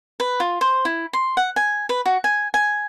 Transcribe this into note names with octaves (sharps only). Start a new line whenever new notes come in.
B4
F4
C5
E4
C6
F#5
G#5
B4
F#4
G#5
G#5